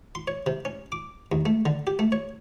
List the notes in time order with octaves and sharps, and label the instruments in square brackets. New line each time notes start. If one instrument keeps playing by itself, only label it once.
[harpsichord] C6
C#5
C3
C#4
D6
D#2
A3
D3
G4
A3
C#5